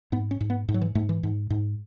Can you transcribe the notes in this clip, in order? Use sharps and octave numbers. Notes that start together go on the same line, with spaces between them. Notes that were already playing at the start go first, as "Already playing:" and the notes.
G#2 B3
C#4
G#2
B3
G#2
F#3
E3
G#2 A3
E3
G#2
G#2